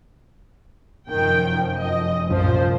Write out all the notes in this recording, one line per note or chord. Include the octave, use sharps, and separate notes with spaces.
F1 F#2 D#3 F3 G5
D#5
C2 F#2 A#2 F3 C5